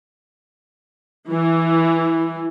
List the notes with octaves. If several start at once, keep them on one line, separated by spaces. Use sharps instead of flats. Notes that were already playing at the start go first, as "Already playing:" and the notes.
E3